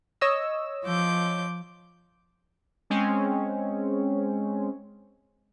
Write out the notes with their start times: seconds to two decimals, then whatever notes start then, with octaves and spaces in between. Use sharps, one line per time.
0.21 C#5 D#5 E6
0.84 F3 D6 G6
2.90 G#3 C4 C#4